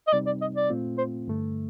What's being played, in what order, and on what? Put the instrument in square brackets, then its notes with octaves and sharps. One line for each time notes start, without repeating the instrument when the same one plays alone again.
[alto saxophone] D#5
[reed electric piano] C3 G3 C4 D#4 [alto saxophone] D5
[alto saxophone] D5
D#5
D5
[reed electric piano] A#2 A3 C4 F4
[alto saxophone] C5
[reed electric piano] G2 D3 A3